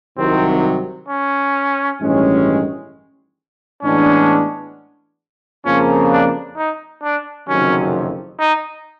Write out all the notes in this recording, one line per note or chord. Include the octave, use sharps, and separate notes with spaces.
C2 C3 D#3 F#3 C4
C#4
A1 G2 D#3 G#3 C#4
A2 E3 G#3 B3 C#4 D4
F2 C#3 F3 A#3 C#4
D4
D#4
D4
F#1 F2 C3 D#3 F#3 C#4
D#4